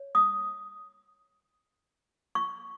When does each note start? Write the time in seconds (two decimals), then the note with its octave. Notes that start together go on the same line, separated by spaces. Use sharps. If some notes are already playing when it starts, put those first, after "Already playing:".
Already playing: C#5
0.15 D#6
2.35 C#6